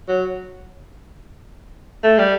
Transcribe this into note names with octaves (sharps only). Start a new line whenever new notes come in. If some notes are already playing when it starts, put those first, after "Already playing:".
F#3
A3
G3